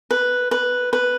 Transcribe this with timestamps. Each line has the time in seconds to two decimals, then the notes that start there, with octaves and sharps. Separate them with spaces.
0.11 B4
0.51 B4
0.93 B4